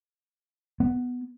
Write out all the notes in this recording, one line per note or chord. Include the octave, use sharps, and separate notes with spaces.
B3